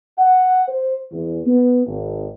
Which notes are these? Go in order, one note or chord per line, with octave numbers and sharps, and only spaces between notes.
F#5
C5
E2
B3
G#1